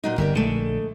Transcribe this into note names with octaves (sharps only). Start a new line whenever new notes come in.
A#2 F#3 D#4
G1 G4 A#4 D5
A#1 D3 G#3 A3